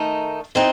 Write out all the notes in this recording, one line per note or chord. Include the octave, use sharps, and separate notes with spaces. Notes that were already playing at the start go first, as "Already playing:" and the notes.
Already playing: D#3 A3 D#4
E3 C4 D#4